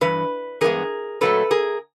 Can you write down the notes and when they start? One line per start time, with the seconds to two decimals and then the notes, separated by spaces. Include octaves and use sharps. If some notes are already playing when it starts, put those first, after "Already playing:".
0.01 G2 E3 B4
0.61 G2 E3 G#3 B3 G#4 A#4
1.21 A#2 F#3 A3 A4 B4
1.51 G#4 A#4